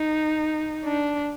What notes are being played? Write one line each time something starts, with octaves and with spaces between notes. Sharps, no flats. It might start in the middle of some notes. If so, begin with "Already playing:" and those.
Already playing: D#4
D4